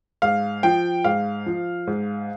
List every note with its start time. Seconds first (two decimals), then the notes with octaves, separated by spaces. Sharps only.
0.22 G#2 F5
0.63 F3 G5
1.04 G#2 F5
1.46 F3
1.87 G#2